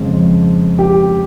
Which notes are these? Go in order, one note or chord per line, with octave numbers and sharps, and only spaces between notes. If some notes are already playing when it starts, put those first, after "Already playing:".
Already playing: F2 C#3 F3 G#3
G4